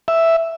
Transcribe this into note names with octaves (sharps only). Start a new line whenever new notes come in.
E5